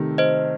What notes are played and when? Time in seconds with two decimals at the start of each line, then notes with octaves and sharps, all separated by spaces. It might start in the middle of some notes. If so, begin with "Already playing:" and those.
Already playing: C3 D#3 A3
0.18 C5 D#5